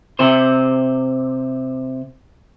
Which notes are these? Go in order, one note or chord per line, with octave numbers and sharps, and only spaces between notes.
C3 C5